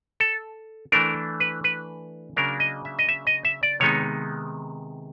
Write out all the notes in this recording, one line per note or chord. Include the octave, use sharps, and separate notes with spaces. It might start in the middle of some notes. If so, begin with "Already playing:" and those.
A4
E3 A3 D4 A#4
B4
B4
C#3 F#3 A#3 D4 A#4
D#5
E5
D#5
E5
D#5
E5
D5
C3 D#3 G#3 B3 D#4 C#5